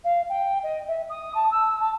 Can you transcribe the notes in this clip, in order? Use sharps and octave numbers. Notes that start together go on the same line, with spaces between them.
F5
G5
D#5
E5
D#6
A5
E6
A5